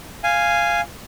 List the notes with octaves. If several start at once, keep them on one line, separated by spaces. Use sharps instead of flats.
F5 G#5